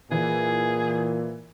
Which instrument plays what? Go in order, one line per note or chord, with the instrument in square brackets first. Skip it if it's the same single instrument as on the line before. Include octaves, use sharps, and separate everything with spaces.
[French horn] A#2 [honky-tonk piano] E3 [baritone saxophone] G#4